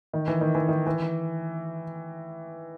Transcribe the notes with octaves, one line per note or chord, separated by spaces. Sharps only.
D#3
E3
D#3
E3
D#3
E3